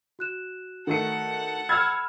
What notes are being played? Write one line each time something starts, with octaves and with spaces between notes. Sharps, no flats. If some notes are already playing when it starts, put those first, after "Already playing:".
F#4 F#6 E7
D#3 A3 A4 F#5 C#7
B5 E6 F6 G#6